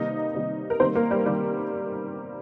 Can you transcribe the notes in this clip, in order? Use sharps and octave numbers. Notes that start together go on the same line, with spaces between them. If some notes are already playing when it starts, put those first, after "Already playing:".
Already playing: C3 D#3 G3 A#3 D#4 D#5
C3 D#3 G3 A#3
A#4
D#3 G3 A#3 C4 C5
A#3 A#4
G3 G4
D#3 G3 A#3 G4